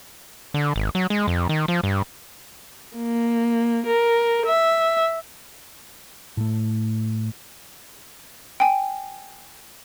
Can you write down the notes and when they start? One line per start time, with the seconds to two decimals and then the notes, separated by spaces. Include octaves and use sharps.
0.54 D3
0.76 G#1
0.95 F#3
1.10 G#3
1.28 F2
1.49 D#3
1.68 F3
1.84 G2
2.96 A#3
3.87 A#4
4.46 E5
6.37 A2 A3
8.60 G5 G#5